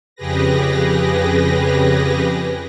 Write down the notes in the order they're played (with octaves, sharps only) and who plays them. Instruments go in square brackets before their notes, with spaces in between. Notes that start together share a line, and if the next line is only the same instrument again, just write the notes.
[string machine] F2 C#3 G4 G#4 B4 A#6